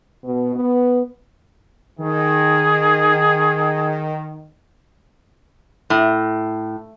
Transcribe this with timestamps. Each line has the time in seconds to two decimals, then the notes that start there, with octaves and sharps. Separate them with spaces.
0.24 B2
0.56 B3
2.00 D#3 G#4
5.90 A2